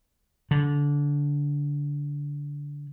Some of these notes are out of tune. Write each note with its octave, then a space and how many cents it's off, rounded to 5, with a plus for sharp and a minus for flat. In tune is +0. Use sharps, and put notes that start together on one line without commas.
D3 -20